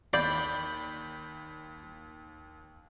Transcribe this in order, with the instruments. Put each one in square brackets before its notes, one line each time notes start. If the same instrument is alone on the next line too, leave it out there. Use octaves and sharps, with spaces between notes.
[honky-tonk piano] D#2 [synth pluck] D5 C7 [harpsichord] B5 [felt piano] G6